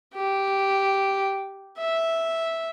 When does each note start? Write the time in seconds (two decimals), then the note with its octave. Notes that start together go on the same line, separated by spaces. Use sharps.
0.15 G4
1.78 E5